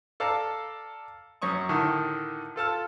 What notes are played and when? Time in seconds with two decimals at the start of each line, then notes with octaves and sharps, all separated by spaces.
0.20 A4 D5 F5 A5 A#5
1.42 F#2 C#4 C#6 D#6
1.69 A2 D3 D#3
2.56 F4 A4 A5 F6